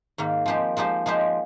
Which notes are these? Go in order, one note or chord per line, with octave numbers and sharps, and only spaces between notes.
G#2 D#3 A#3
F3 G#3 D#4 G4 C5
F3 G#3 D#4 G4 C5
F3 G#3 D#4 G4 C5